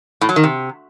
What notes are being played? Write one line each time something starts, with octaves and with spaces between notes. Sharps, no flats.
A2
F#3
D#3
C3